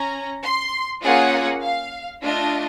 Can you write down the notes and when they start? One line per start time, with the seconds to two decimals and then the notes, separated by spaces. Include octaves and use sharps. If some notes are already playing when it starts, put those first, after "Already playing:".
Already playing: C#4 A#5
0.43 C6
1.03 A#3 C#4 F4 G#4 F#5
1.62 F5
2.22 A3 D4 F4 D#5